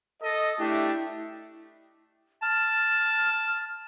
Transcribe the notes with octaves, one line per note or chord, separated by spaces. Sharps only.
A4 D#5
A3 D4 E4 G4
A5 F6